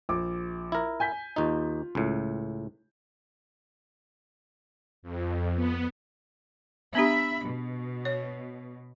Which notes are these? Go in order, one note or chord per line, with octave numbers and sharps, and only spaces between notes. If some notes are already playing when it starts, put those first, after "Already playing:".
A#1 D6
E4 A#4
G#5 G6 B6
D#2 D#4 F4
C#2 A2
F2
B3
B3 D4 G4 E5 B5
B2
C#5